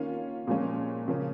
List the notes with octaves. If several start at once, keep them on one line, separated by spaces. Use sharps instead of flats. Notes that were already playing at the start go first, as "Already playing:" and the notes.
Already playing: D#3 A#3 C#4 F4
A#2 F3 G#3 C#4
C#3 F3 A#3 C#4